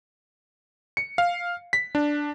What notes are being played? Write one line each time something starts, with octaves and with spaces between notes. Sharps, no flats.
C#7
F5
B6
D4